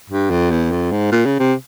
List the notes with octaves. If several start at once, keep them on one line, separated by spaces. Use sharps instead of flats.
G2
F2
E2
F2
G#2
A#2
C#3
C3